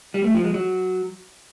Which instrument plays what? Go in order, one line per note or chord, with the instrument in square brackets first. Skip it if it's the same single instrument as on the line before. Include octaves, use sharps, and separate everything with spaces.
[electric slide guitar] G3
A3
F3
G#3
F#3